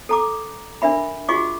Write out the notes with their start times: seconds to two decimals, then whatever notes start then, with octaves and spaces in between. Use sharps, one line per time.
0.09 A4 A#5 D6
0.82 D4 A#4 E5 B5
1.29 F4 F#4 G#4 D#5 C#6 D6